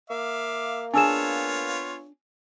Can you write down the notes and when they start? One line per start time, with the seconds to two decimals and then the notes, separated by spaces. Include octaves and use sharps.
0.10 A#3 E5 F5 D6
0.94 B3 D4 F4 G#4 C#5 G#5 E6 E7